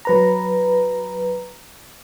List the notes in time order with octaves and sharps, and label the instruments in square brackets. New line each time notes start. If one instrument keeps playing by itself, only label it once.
[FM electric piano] F#3 B4 A#5